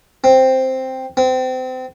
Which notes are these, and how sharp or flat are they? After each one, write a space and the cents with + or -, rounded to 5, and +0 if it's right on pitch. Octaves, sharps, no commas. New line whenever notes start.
C4 +0
C4 -30